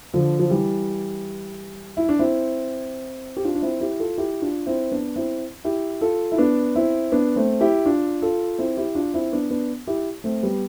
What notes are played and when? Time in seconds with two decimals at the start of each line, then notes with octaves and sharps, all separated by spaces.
0.14 D3 F3
0.39 F3
0.50 E3 G3
1.97 E4
2.09 D4
2.19 C4 E4
3.37 G4
3.44 D4 F4
3.55 D4
3.62 C4 E4
3.81 E4 G4
3.99 F4 A4
4.18 E4 G4
4.42 D4 F4
4.66 C4 E4
4.91 B3 D4
5.16 C4 E4
5.64 E4 G4
6.01 F4 A4
6.32 E4
6.38 B3 D4
6.75 C4 E4
7.12 B3 D4
7.36 A3 C4
7.61 E4 G4
7.85 D4 F4
8.22 F4 A4
8.58 C4 E4
8.77 E4 G4
8.95 D4 F4
9.14 C4 E4
9.32 B3 D4
9.51 B3 D4
9.87 E4 G4
10.24 A3 C4
10.43 G3 B3